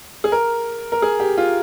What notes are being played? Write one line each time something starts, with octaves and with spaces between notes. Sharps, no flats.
G#4
A#4
A#4
G#4
G4
F4